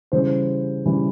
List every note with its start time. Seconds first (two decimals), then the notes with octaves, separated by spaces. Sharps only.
0.12 C#3 E3 G3 C5
0.86 C#3 E3 G3